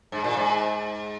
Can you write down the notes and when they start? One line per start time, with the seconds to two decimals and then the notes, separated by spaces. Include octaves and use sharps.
0.12 G#2
0.24 A#2
0.37 G#2